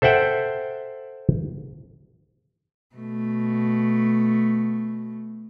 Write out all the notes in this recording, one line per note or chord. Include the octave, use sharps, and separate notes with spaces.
A4 C5 E5 F#5 G5
B2 A3